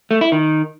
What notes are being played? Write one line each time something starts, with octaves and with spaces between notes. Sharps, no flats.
A3
E4
D#3